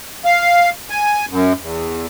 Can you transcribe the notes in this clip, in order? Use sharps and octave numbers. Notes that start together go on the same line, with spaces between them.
F5
G#5
F#2
E2